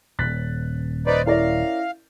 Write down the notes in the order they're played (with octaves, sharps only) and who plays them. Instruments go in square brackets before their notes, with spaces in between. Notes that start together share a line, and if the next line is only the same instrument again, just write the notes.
[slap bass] D#1 [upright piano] F#6 A6 B6
[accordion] D#4 B4 D5 [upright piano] C5
[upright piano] C#4 A#4 D5 [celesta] E4 E5 A#6 [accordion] F5